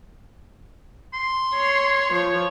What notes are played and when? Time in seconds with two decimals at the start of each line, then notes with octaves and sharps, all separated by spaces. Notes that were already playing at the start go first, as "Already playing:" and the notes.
1.14 C6
1.55 C#5
2.11 F3 C#5